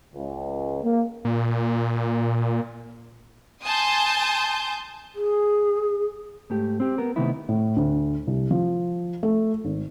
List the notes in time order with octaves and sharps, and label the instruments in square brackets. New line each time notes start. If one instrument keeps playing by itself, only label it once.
[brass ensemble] C#2
A#3
[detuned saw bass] A#2
[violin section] G#5 A5 C6 D#6 G6
[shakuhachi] G#4
[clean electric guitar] G#2 A3 G4
C4 G4
B3 A#4
C3 D#3 A3 B3 D#4 E4
[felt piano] A2
D2
C2
F3
A3
G#1